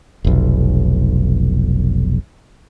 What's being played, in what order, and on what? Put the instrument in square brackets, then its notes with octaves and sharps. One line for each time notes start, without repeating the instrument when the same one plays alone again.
[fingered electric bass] F1 B1